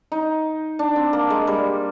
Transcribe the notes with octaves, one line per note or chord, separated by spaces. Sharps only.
D#4
D4
C4
A#3
G#3
G3